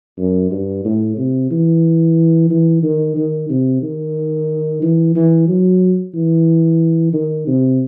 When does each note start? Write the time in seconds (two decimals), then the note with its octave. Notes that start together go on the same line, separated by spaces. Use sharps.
0.18 F#2
0.51 G2
0.84 A2
1.17 C3
1.50 E3
2.50 E3
2.83 D#3
3.17 D#3
3.49 C3
3.82 D#3
4.82 E3
5.15 E3
5.48 F#3
6.15 E3
7.13 D#3
7.47 C3